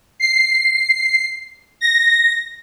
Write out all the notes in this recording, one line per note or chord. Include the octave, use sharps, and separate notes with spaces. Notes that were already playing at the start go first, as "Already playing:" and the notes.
C7
A#6